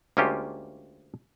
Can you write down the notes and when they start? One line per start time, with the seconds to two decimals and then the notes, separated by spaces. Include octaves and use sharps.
0.17 D2 G#3 A#3 C#4 F4 G4